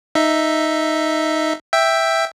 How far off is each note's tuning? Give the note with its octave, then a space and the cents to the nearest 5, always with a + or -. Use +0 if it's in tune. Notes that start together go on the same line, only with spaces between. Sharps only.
D#4 +0 E5 +0
E5 +0 G5 +5